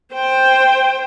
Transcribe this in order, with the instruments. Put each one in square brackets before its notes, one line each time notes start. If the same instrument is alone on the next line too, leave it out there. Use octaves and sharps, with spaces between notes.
[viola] C5 G5